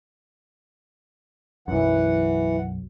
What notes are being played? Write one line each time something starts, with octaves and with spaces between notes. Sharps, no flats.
B1 F#2 E3 F#5